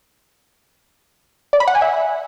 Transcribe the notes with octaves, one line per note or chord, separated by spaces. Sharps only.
D5
B5
F#5
G#5
E5